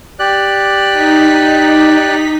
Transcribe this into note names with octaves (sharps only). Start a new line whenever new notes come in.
G4 D5 F#6
D#4 B6